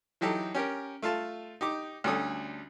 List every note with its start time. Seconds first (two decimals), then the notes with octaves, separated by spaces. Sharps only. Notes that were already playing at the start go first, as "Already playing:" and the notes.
0.21 E3 F#3 D#4 G4 A4
0.54 C#4 G4 A#4
1.02 A3 F4 F5 A5
1.61 D#4 G4 D6
2.04 D2 G3 C#4 A4 D#6